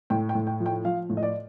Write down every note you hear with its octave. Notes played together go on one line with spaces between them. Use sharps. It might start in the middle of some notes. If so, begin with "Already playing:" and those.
A2 G5
G5
A2
G5
F3
G5
F3 F5
A2
D#5
D5